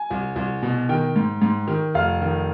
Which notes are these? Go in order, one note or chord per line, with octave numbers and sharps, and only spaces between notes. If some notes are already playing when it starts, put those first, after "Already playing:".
Already playing: G#5
C2
C2
B2
D#3 G5
G#2
G#2
D#3
F1 F5
D#3